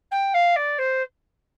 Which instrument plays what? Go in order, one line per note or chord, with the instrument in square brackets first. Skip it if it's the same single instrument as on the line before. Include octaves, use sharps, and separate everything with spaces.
[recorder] G5
F5
D5
C5